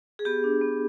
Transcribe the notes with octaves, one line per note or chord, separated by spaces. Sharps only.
G#4
B3 G4
D4
B3